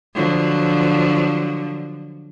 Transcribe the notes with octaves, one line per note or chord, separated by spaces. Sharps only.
D3 F3 F#3